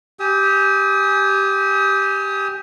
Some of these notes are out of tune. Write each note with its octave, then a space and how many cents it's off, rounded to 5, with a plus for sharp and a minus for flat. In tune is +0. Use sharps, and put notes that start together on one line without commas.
G4 +0 G#5 +0 D#6 +35